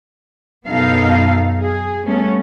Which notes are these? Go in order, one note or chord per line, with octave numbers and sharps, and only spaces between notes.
F#2 B2 B3 D#4 A4 F5
G#4
G3 A3 B3 C#4